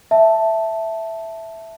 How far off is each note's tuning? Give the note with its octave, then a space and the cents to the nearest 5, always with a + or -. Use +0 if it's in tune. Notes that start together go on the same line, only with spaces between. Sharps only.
E5 +0 A5 +0